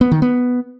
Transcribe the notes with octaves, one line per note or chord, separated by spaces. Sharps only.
B3
D#3
B3